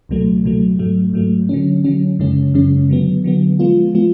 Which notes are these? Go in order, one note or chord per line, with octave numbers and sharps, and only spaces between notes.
C#2 B2 F#3 A3
C#2 B2 F#3 A3
G#2 F#3 A3
G#2 F#3 A3
D3 F#3 C#4
D3 F#3 C#4
F#2 C#3 G#3 C#4
F#2 C#3 G#3 C#4
D3 F#3 B3
D3 F#3 B3
F3 G#3 B3 F4
F3 G#3 B3 F4